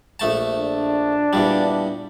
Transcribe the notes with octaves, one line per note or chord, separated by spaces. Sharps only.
A#1 A3 A5
D4
E2 A#2 G3